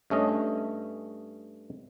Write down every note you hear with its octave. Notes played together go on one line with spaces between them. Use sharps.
G2 A3 C#4 D#5